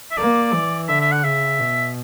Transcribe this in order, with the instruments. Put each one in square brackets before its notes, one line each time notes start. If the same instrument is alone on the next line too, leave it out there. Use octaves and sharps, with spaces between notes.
[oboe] E5
[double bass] A#3 [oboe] D5
[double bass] E3
[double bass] D3 [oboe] E5
[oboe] E5
F#5
[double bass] C#3 [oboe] E5
[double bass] B2